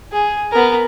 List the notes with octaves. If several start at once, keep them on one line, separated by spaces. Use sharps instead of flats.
G#4
B3 A#4